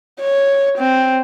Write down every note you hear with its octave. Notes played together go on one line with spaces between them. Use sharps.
C#5
C4